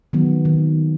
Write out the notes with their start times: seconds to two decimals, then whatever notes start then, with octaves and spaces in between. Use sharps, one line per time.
0.13 D#3 F#3 B3
0.45 D#3